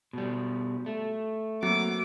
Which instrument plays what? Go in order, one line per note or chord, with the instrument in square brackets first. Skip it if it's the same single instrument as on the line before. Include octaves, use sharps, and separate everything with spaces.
[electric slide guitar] B2 G3
A3
[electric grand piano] F#3 [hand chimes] A#3 C4 [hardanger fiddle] D6